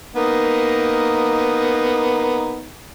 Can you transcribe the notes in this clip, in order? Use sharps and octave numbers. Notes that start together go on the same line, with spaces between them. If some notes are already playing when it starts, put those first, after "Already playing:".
A#3 B3 D#4